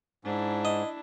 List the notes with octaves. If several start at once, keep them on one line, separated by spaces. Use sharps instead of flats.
G#2 D4 E4
D#5